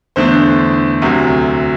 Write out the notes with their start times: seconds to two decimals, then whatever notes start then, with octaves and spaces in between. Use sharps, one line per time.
0.16 E2 D3 A3 D4 C5
1.02 D2 C3 F#3